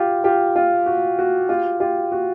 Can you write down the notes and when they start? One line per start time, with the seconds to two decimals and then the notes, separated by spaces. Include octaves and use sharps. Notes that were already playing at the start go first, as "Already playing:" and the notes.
Already playing: F4 G4
0.24 F4 G4
0.56 F4
0.86 F#4
1.19 F#4
1.49 F4 G4
1.80 F4 G4
2.12 F#4